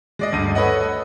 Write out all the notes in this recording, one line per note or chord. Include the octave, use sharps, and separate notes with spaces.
G#3 D5 D#5
D2 G2 D#7
A4 B4 C#5 D#5 F#5